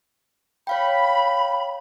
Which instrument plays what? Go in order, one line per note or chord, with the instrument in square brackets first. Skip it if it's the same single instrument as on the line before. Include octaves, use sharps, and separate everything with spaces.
[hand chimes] C#5 F5 G5 [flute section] B5